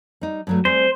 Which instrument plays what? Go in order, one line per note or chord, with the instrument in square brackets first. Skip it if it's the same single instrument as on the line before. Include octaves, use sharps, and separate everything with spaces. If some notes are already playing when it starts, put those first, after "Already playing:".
[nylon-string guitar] G3 D#4
G2 F#3 A3
[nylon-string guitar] G3 C4 G#4 [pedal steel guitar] C5